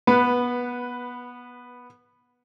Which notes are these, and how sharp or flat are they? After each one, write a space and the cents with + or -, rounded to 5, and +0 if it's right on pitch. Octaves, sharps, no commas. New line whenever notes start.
B3 -15 B4 +0